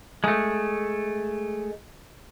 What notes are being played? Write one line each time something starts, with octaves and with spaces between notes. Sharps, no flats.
G#3 A3